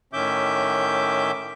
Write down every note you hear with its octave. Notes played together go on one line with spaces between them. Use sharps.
A2 D#3 C#4 E5 D6 G6